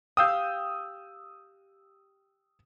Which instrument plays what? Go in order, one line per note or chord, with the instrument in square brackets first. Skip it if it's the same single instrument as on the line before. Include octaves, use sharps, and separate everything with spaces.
[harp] G4 F5 G5 [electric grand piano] D#6 E6 G6